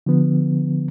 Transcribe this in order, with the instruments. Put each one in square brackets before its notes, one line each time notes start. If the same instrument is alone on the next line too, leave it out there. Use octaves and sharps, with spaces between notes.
[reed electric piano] D3 F3 B3